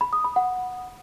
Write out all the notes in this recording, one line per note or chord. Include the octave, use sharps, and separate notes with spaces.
B5
D#6
B5
F#5